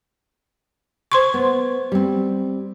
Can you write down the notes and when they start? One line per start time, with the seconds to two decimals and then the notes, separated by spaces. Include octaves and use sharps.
1.12 C5 C6 C#6
1.34 B3
1.92 G3 C4